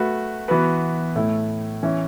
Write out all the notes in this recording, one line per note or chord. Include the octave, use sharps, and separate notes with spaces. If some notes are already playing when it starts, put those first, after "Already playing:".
Already playing: A3 F#4 B4
E3 B3 F#4 B4
A2 A3 E4
E3 C#4 E4